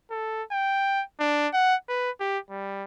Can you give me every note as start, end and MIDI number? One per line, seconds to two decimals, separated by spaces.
0.10 0.43 69
0.51 1.02 79
1.20 1.48 62
1.53 1.75 78
1.89 2.10 71
2.20 2.38 67
2.50 2.84 55